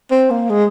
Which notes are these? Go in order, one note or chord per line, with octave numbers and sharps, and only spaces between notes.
C4
A#3
G#3